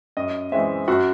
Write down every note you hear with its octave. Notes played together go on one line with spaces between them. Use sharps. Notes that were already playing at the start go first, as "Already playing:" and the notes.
F#2 D#5
E3 G#3 C4 E5
F#2 F#4